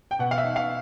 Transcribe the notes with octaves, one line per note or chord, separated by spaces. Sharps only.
G5
B2 F#5
F5
E5
D#4
F5